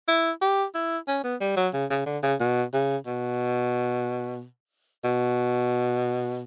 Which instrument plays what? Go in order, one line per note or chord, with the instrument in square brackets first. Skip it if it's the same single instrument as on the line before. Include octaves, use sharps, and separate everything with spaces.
[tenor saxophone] E4
G4
E4
C#4
B3
G3
F#3
C#3
C#3
D3
C#3
B2
C#3
B2
B2